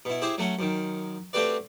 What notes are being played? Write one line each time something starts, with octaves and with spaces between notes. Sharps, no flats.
B2 E4
E4 G4 G#4 C5
F#3 A3 C#4 F#5
F#2 D#3
A3 C4 F#4 G4 B4 D5